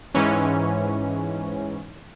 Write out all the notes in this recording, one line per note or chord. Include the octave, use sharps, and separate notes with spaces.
G#2 E3 C#4